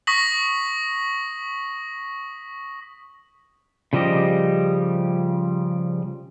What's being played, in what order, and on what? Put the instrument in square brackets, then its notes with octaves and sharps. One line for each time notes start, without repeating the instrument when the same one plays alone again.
[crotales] C#6 D#6 A#6 B6 F#7
[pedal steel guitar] C#3 F3 G3 G4 D#5